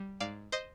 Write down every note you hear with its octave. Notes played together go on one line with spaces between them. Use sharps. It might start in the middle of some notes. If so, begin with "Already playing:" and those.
Already playing: G3
G#2 D5 F5
C5 D#5